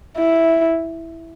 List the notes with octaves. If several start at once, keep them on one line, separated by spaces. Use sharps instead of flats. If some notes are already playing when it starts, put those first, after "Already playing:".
E4